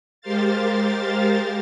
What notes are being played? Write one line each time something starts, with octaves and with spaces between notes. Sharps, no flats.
G#3 G4 A#4 C5 F5 A6